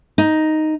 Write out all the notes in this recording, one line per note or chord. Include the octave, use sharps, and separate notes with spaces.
D#4